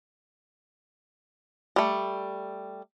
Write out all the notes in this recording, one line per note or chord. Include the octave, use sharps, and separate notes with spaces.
G3 A3